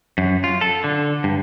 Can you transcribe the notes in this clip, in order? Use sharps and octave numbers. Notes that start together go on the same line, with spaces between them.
F#2
F4
A4
D3
G2